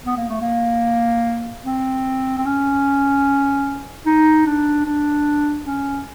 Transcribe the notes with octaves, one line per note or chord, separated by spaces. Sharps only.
B3
A#3
A3
A#3
C4
C4
C#4
D#4
D4
D4
C#4